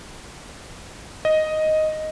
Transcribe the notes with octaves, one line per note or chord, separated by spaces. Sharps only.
D#5